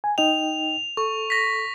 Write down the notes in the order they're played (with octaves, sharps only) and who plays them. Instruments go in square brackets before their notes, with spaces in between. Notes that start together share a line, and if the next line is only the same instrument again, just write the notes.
[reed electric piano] G#5
[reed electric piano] D#4 D#5 G5 [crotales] F7
[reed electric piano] A4 [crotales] C#6
[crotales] A#6 B6